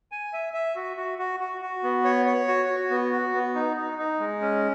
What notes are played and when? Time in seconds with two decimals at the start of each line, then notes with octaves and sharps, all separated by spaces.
0.12 G#5
0.33 E5
0.54 E5
0.76 F#4
0.97 F#4
1.19 F#4
1.40 F#4
1.61 F#4
1.83 B3
2.04 C#5
2.26 C#5
2.48 F#4
2.69 F#4
2.91 B3
3.12 F#4
3.34 B3
3.55 D#4
3.77 D#4
3.99 D#4
4.20 G#3
4.41 C#4